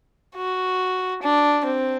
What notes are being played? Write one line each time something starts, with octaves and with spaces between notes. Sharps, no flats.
F#4
D4
C4